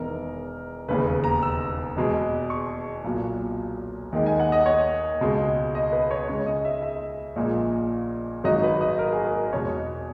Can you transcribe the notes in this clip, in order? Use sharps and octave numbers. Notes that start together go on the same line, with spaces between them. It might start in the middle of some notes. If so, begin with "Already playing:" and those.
Already playing: E1 E2 D#3 A#4
E1 D#2 C#3 B4
A#5
E6
E2 B2 G#3
C#6
B1 A#2 F#3
D#2 D#3 G#3
G#5
F#5
D#5
C#5
C#2 B2 G#3
D#5
B4
C#5
C#2 C#3 G#3 C#5
D#5
E5
E5
A#1 A#2 G#3
G#1 G#2 F#3 D#5
B4
D#5
A#4
G#4
A#4
E2 B2 G#3 C#5